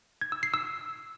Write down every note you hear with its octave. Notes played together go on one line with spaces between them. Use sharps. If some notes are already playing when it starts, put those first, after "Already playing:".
G#6
E6
C7
E6